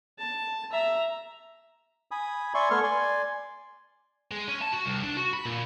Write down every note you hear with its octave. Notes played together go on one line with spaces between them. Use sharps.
A5
E5 A#5
G#5 B5 D#6
D5 E5 G#5 C6 C#6
A3 B3 C6 C#6 F6
D5 G#5 C6
G#3
C#4
A5
F#4
C2
D4
F#4
B5
A#2